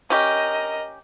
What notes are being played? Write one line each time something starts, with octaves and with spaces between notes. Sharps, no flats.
C#4 G4 A#4 D#5